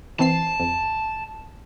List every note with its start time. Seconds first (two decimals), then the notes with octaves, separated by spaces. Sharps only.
0.19 E3 C4 A5 C7
0.60 F2